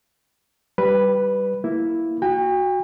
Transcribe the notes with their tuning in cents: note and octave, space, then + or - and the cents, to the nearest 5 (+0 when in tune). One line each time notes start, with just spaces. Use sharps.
G3 -10 B4 +0
A#3 +0 E4 +0
F#4 +0 G5 +40